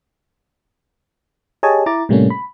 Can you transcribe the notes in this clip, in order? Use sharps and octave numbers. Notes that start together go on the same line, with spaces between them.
G4 G#4 C#5 D#5 G#5 A5
E4 A#5 D6 A6
A2 C3 G3 A3 A#3 C#4
B5